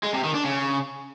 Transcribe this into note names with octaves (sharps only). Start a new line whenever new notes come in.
G#3
C3
D#3
D4
C#3